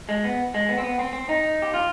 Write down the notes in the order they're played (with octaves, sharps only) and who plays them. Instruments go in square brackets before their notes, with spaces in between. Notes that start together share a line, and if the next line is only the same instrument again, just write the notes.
[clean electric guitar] G#3
B3
G#3
B3
C4
B3
C4
C4
D#4
G4
F4